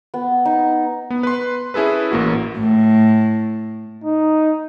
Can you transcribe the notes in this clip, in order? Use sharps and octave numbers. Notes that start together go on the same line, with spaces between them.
B3
D#4
B3
B4 C6
C#4 E4 G#4 A4 B4
A1 A#3 F#4
A2
D#4